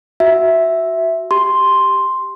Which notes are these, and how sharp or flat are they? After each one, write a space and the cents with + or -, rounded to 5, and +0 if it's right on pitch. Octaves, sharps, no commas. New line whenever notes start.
F#4 +0 E5 +0
G4 +0 C6 +0